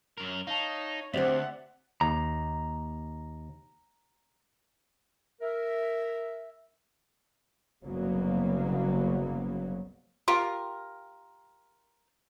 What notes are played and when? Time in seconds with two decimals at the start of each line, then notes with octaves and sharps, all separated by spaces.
0.18 F#2 A#4
0.47 D#4 C#5 F5 A5
1.14 D2 C4 G4 C5 D5 E5 F#5
2.01 D#2 A#5
5.41 A#4 E5
7.83 F#1 C2 C#3 F#3 A#3 B3
10.28 F4 G4 A#4